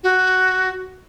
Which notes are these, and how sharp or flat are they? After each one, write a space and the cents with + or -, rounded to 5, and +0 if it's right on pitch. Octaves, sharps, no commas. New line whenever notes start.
F#4 +5